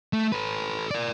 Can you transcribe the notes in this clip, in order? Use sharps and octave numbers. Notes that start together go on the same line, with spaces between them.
A3
A4 B4
A#4 D5